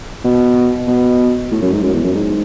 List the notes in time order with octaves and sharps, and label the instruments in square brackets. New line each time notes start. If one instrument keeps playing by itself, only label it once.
[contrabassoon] B2
B2
A2
F#2
G#2
F#2
E2
F#2
G#2